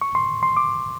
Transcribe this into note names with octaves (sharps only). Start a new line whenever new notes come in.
C#6
C6
C6
D6